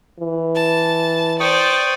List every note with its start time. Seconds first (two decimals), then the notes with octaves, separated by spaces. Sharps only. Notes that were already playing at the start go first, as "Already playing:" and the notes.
0.20 E3
0.56 A5
1.40 C5 D5 G5 C#6 D#6